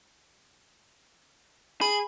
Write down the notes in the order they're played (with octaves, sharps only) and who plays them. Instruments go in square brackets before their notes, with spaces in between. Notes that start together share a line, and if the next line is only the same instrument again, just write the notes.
[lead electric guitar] G#4 [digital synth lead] B5